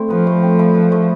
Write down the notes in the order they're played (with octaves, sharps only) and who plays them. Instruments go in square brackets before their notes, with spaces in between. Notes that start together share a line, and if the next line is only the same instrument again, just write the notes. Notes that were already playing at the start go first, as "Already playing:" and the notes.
Already playing: [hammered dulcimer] A3 C4 E4
[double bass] F3 [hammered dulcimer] B4
[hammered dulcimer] A3
C4
E4
B4
A3